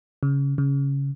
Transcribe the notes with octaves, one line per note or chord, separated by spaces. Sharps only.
C#3
C#3